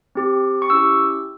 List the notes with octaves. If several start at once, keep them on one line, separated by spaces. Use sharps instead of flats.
C4 G4
C#6
C#4 E4 G4 E6